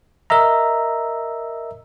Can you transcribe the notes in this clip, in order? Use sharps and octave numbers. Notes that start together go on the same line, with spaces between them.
A#4 D#5 E5 A#5